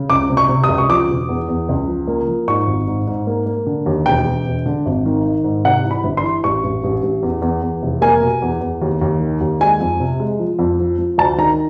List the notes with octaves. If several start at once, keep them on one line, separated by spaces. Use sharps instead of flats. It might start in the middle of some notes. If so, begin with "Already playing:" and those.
Already playing: C#3
C#2 D6
C3
C#6
C3
D#6
C#2
C#6
F3 D6
E1
E2
E2
C#2
F3
A#3
F3
G#2 C#6
G#1
G#2
G#2
A#3
A#3
D3
D#2
E1 G5
E1
E1
D3
G#1
D#3
D#3
G#2
C3 F#5
E3
B5
G1
C6
E3
A1 C#6
A1
A1
A1
E2
E2
E2
F1
A#3 G#5
B2
E2
E2
D#2
D#2
D#3
D#2
G#3 G#5
F2
C3
G#3
F3
F2
F3
F3
D2 A5
D#3 A#5